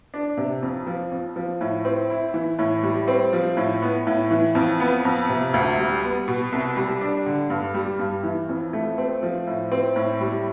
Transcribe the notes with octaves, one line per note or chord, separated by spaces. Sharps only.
D4
C3
F2
F3
F2
F3
A2
C4
E4
E3
A2
G3
C4
F3
A2
B3
A2
E3
F2
B3
F2
C3
D2
G3
B3
B2
C2
G3
D4
D3
G2
G3
G2
E3
F2
A3
C4
F3
A2
C4
A2
G3